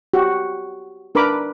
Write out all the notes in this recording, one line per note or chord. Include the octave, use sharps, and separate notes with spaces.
F#4 G4
D4 A#4 B4 B5 D6